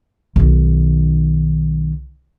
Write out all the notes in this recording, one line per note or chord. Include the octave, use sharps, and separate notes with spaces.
B1 D#3